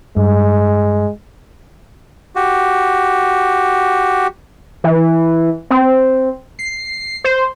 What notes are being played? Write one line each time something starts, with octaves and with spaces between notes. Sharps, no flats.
G2 G#3
F#4 G4
E3
C4
C7
C5